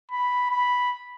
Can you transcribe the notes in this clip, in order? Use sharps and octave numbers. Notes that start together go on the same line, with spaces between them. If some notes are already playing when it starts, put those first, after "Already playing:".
B5
B5